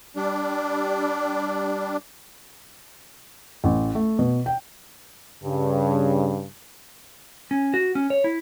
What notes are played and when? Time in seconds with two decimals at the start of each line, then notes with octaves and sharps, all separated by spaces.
0.16 G3 D4
3.64 A1
3.95 A3
4.19 B2
4.46 G5
5.43 G2 C#3
7.51 C#4
7.74 F#4
7.95 C#4
8.10 C#5
8.24 E4